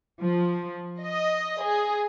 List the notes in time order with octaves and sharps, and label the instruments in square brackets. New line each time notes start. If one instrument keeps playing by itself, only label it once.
[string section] F3
D#5
G#4